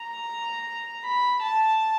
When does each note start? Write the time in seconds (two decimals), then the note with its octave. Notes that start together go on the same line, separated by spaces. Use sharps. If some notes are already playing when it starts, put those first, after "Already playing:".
Already playing: A#5
1.04 B5
1.42 A5